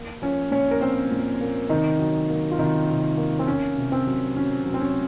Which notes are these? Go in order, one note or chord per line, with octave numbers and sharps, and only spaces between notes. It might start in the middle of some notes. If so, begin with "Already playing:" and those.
Already playing: A#3
F3 C#4 C#5
A#2 C#4 C#5
A#4
A#3 C4 C5
A#2
A#3
C3 D#3 D#4
F#3
A#3
F4
C3 D#3 D#4
C3
A#3
C4
A#3 C#4
C3
C4
F#3
F#3 C#4
F#3
C4
C#4